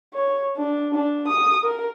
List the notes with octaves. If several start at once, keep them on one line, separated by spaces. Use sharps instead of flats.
C#5
D4
D4
D#6
A#4